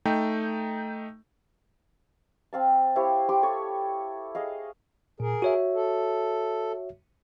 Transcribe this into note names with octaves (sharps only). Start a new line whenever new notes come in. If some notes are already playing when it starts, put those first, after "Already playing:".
A3 D#4 G5
C4 F5 A5
E4 G4 C5 C#5
G4 C6 D6
A4 C#5
G#4 D#5 F5
A#2 G#4 A#4
F#4 C#5 E5
A4